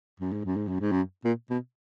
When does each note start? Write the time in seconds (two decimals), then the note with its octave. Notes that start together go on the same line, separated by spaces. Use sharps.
0.20 F#2
0.32 G#2
0.45 F#2
0.57 G#2
0.68 F#2
0.80 G#2
0.92 F#2
1.25 A#2
1.50 B2